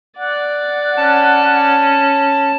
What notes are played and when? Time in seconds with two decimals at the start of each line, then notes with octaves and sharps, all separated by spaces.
0.18 D5 F#5
0.97 C#4 A5